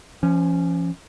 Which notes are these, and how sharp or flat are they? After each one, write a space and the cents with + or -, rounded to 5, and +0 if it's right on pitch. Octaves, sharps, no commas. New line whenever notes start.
F3 -35 C#4 +0